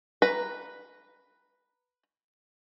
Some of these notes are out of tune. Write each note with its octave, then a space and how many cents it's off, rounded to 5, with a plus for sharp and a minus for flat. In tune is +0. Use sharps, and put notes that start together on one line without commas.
B4 +0 A#5 +0